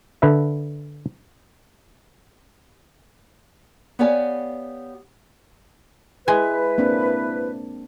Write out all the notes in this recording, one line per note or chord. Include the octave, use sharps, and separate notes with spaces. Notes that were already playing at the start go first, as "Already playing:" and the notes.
D3 B4 E5
B3 G4 C#5 D5 F5 G#5
G#3 E4 B4 G#5
A#3 C4 D4